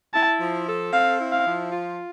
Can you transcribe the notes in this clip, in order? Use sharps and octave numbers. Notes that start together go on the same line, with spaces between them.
E4 A5
F3
A4
C4 F5
E4
F5
F3
F4